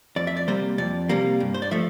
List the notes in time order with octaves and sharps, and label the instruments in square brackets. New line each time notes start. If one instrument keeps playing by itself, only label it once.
[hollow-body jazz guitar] F2 D5
E5
D5
C3 G3 A#3 C5
F2 D5
C3 G3 A#3
G2
C5
D5
F3 A3 E5